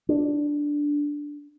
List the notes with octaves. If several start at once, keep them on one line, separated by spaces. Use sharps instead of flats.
D4